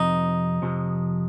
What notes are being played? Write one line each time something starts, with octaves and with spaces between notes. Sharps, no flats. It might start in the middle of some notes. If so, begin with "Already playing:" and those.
Already playing: F2 C3 F3 D#4
F2 C3 F3